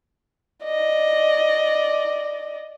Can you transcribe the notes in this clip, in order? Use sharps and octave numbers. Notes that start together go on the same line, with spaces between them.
D5 D#5